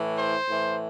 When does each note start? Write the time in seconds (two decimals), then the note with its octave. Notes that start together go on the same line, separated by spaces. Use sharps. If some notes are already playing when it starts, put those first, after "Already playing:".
Already playing: A2 E3
0.17 C5
0.46 A2 E3